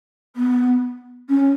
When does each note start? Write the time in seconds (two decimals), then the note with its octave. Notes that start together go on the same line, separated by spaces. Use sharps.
0.36 B3
1.29 C#4